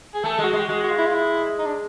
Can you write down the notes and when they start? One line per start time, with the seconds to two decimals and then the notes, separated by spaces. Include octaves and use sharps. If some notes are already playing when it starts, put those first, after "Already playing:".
0.14 G#4
0.23 A3 A4
0.39 G#3 F#4
0.53 G#3
0.58 G4
0.63 F#4
0.69 G#3
0.83 F#4
0.91 F4
0.98 E4
1.06 F4
1.14 E4
1.59 D#4
1.66 D4